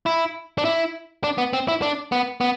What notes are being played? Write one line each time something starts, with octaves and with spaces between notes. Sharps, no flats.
E4
D4
E4
D4
B3
C4
E4
D4
B3
B3